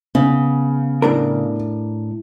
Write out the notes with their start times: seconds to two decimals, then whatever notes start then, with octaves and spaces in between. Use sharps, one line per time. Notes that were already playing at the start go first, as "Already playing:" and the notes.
0.15 C#3 B3
1.02 A2 D4 A#4